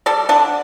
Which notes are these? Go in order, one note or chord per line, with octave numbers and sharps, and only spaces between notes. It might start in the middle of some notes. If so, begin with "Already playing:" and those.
G3 A4 D5
D3 D4